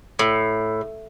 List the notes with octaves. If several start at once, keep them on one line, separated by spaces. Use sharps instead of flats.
A2